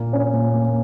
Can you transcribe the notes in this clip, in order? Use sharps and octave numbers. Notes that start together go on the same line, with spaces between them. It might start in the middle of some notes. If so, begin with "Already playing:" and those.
Already playing: A#2 A#3
C#4
A#2
A#3